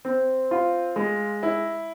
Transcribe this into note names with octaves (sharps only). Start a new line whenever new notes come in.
C4
F4
G#3
E4